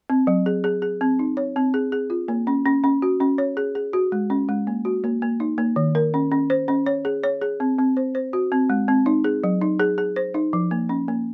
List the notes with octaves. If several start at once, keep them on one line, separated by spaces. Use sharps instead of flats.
C4
F#3
G#4
G#4
G#4
C4
D#4
C#5
C4
G#4
G#4
F4
A#3
C#4
C#4
C#4
F#4
C#4
C#5
G#4
G#4
F#4
G#3
C#4
G#3
A#3
F#4
A#3
A#3
D#4
A#3
D#3
A#4
C#4
C#4
C5
C#4
C#5
G#4
C#5
G#4
C4
C4
C5
C5
F#4
C4
G#3
C4
D#4
G#4
F#3
D#4
G#4
G#4
C5
D#4
F3
A#3
C#4
A#3